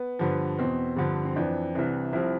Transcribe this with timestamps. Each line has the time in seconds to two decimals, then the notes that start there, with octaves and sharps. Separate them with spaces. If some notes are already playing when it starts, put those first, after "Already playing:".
Already playing: B3
0.19 G2 D3 F3
0.59 E2 B2 C4
0.96 G2 D3 F3
1.25 C4
1.36 F2 E3 D4
1.75 C2 C3 E3
2.13 C2 C3 F3 E4